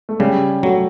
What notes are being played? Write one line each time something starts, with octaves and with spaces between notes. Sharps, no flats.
A3
C#3 G3
F#3 A3